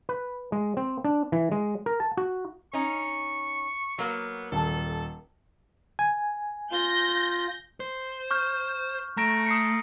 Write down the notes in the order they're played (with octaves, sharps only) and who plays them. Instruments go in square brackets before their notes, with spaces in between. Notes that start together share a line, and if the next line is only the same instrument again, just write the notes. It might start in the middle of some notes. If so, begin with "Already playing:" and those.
[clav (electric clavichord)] B4
G#3
C4
D4
E3
G#3
A#4
A5
F#4
[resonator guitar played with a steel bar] C#4 D#4 [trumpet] C#6
[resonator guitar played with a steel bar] F#3 A#3 [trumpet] B3
[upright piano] D#1 A5 [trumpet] A4
[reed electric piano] G#5
[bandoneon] F4 [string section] G6 A#6
[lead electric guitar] C5
[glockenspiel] C#6 F6 G6
[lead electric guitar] A3 [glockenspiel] A#5 A#6 D7
[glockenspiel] D#6 C7 C#7